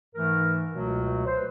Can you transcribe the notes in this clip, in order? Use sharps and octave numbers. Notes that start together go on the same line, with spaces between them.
G#2 E3 A3 A#4
C#2 B2 F#3 A3
C5
B4